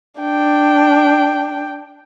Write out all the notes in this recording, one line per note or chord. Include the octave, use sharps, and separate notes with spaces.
D4 G5